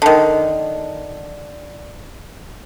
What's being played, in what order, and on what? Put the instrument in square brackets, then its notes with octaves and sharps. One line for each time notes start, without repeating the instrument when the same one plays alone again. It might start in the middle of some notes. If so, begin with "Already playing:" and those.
[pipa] D3 D#3